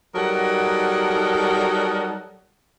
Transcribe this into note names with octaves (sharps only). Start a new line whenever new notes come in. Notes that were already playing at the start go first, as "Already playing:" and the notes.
F#3 G3 D#4 A4 A#4 F#5